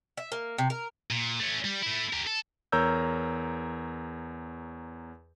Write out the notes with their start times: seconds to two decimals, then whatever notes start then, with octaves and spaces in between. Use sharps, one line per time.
0.17 E5
0.32 A#3
0.58 C3
0.70 A#4
1.10 A#2
1.40 A3 C#4
1.65 G3
1.83 A3 E4
2.13 G4 A#4
2.27 A4
2.72 E2 A#4 C#5 A#5 E6 G6